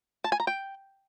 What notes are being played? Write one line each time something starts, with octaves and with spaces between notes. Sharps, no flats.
A5
G#5
A#5
G5